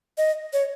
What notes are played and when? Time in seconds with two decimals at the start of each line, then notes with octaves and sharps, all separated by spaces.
0.18 D#5
0.53 C#5